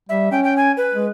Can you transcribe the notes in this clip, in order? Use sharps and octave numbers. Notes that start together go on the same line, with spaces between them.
G3 E5
C#4 G5
G5
G#5
B4
G#3